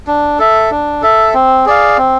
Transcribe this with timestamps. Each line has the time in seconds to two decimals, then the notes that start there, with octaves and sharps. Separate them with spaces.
0.07 D4
0.39 A4 E5
0.71 D4
1.02 A4 E5
1.34 C4
1.66 G#4 D5 F5
1.98 C4